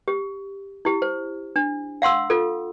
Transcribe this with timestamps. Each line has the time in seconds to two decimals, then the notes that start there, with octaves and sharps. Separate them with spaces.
0.08 G4
0.85 E4 G4
1.02 C5
1.56 D4
2.02 F5 F#5 C6 E6
2.30 F4 A4